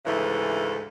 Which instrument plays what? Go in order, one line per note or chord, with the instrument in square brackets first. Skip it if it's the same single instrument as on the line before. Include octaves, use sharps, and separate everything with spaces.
[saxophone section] D2 G#2 C#3 E3 A3